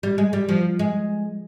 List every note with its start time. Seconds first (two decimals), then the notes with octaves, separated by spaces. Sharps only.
0.03 G3
0.18 G#3
0.33 G3
0.49 F3
0.79 G#3